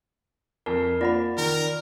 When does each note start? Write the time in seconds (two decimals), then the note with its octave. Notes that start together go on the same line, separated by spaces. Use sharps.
0.66 F2 A#4
1.01 A#3 F4 D5 F#5 B5
1.38 D#3 A#4